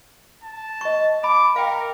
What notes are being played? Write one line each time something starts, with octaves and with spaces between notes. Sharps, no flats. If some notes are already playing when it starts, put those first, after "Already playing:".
A5
D#5 C#6
B5 D6
A#4 F5 G5